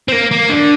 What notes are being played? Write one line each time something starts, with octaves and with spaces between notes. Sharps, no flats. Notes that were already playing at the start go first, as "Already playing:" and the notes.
C4
A#3
A#3
D3